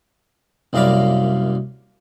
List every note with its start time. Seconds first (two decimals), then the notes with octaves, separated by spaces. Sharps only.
0.73 C2 F#2 A#3 D5 F5 B5